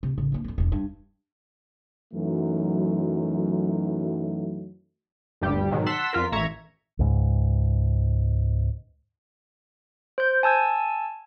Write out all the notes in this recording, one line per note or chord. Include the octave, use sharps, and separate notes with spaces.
C3
A1 C#3
A#3 D4
F2 F#3
E1 D4
G2
F#2 E3 F#3 A3 D#4
G1 D2 G2 G3 G4
G#2 B2 D#3 F#3
F#5 A5 C6 E6 B6 E7
F2 F4 A#4 B6
A1 E5 A#5 C#6 G#6
C#2 G#2
C5 G6
G#5 A5 E6 G#6